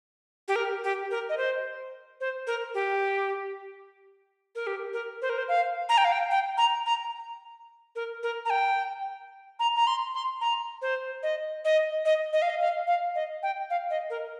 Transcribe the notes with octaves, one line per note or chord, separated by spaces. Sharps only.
G4
A#4
G4
A#4
D#5
C5
C5
A#4
G4
A#4
G4
A#4
C5
A#4
C5
F5
A#5
G5
F5
G5
G5
A#5
A#5
A#4
A#4
A#5
G5
A#5
A#5
C6
C6
A#5
C5
D#5
D#5
D#5
D#5
F5
D#5
F5
F5
D#5
G5
F5
D#5
A#4